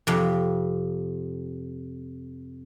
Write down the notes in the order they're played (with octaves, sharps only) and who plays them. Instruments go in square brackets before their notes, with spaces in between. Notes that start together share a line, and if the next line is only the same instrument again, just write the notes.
[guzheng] F2 C3